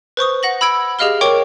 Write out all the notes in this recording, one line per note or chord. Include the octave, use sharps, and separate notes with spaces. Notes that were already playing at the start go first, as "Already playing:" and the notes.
B4 C5 C#6 D#6
F#5 A#6 F#7
B5 E6 G#6 D7
G4 G#4 D#5 F5 F6 G7
A#4 C#5 G5 C#6 D6